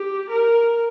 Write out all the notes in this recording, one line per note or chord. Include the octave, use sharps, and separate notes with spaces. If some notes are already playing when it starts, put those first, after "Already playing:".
Already playing: G4
A#4